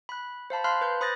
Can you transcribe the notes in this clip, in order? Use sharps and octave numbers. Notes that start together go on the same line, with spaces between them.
B5 F#6
C5 F5 A5 B5
F5 A5 B5 C6 F6 F#6
B4 F#6 G6
C5 B5 D#6 F#6 A6 A#6